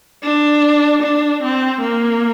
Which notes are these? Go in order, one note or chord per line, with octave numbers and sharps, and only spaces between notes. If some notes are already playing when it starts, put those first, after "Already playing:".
D4
D4
C4
A#3